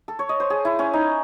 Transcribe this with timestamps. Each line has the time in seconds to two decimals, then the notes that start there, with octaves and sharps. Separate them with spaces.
0.08 A4
0.19 C#5
0.29 D#5
0.40 C5
0.50 G#4
0.65 E4
0.79 C#4
0.93 D#4